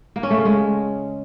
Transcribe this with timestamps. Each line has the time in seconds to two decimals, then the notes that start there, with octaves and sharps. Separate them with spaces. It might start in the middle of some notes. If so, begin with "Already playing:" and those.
0.16 A#3
0.23 C#4
0.30 A3
0.38 C#3
0.45 G#3